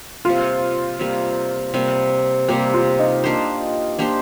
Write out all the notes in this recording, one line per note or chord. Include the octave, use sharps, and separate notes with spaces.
C3 G3 A#3 F4
C3 G3 A#3
C3 G3 A#3
C3 G3 A#3 G4
F4
D#4
A#3 D4 G4 C5
A#3 D4 G4 C5